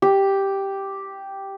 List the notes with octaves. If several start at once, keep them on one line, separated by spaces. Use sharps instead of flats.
G4